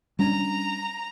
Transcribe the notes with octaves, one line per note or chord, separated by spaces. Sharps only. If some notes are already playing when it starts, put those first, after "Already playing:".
G3 C#4 D4 A#5